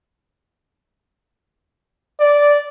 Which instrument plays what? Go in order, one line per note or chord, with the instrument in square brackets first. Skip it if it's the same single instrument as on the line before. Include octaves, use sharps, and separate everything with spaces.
[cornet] D5